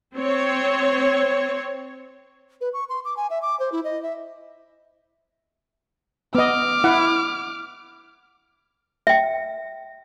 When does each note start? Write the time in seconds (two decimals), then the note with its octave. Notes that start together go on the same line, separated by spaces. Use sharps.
0.16 C4 C#5
2.61 B4
2.73 C#6
2.89 C6
3.05 D6
3.17 G#5
3.30 E5
3.42 D6
3.60 C5
3.72 E4
3.84 D#5
4.03 E5
6.35 B3 D#5 D6 F6
6.84 E4 F#5
9.07 E5 G5